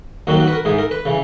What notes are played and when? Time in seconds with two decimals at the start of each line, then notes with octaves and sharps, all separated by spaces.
0.27 D#2 D#3 F#3 F#4
0.40 F#4
0.48 B4
0.53 A#4
0.65 G#2 E3 G#4
0.78 A#4
0.91 B4
1.05 C#3 E3